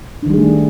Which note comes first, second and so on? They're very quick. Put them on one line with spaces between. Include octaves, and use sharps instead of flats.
D4 D#3 G3 G#4 A3